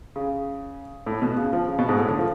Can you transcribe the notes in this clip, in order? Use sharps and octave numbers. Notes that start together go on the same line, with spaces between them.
C#3
A2
B2
C#3
F3
C#3
B2
G#2
A2
D3
F3